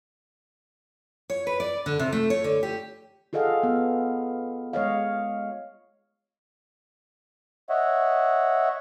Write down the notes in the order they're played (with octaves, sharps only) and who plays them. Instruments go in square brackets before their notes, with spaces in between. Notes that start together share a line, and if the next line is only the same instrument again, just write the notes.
[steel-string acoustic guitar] C#5
B4
D5
D3
C3
A3
C#5
D3
G4
[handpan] F4 G#4 A4 D#5 F5 F#5
B3
G#3 C#5 D#5 F5
[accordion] C#5 D#5 E5 F#5